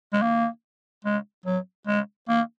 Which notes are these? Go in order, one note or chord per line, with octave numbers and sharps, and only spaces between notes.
G#3
A#3
G#3
F#3
G#3
A#3